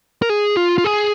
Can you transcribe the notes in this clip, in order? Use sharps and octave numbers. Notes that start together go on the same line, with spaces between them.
A#4
G#4
F4
F4
G#4